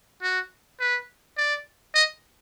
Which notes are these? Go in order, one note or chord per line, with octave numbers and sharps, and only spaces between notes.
F#4
B4
D5
D#5